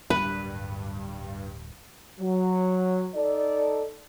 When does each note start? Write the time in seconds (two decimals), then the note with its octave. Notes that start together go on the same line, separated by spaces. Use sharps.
0.10 D1 G2 G3 D4 B4 B5
2.20 F#3
3.15 D#4 A4 D5